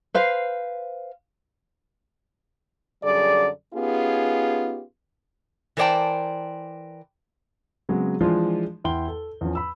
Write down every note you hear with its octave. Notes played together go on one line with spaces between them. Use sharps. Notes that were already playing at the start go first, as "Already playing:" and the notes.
B4 C5 F5
F#2 D3 G3 G#4 D5
B3 C#4 D#4 F4 G4 G#4
E3 A#4 C5 D5 G5 A5
C#3 F#3 G#3 B3 C4
E3 F3 G#3 D4 F4
E2 E4 G5 C6 G7
A4
E2 F3 C#4
B5 E6